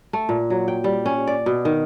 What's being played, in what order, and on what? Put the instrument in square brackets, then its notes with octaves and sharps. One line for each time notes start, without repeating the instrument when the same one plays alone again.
[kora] A3
A#2
F#3
G5
G3
C#4
D5
B2
D#3